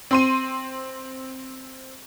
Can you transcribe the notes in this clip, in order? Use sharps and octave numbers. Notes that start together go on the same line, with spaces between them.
C4 C6 D#7